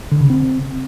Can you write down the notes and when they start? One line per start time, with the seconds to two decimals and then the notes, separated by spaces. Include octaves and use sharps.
0.12 D3
0.21 C#3
0.30 C4